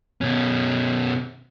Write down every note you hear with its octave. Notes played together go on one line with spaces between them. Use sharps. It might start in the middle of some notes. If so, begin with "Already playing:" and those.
B2 C#4